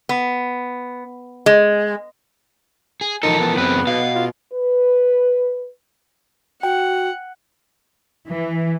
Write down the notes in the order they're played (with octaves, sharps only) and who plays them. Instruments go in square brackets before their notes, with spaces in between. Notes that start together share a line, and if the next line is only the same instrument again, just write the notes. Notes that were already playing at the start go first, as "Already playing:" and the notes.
[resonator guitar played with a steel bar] B3
G#3
[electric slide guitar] G#4
[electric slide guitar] E3 F3 A#4 [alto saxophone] D#4 [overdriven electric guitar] A4
[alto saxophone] B3
[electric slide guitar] F#2 C4 [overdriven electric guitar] C#3 B4
[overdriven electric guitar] B2 [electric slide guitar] F5
[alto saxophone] F4
[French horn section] B4
[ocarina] F#4 [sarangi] F#5 [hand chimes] G5
[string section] E3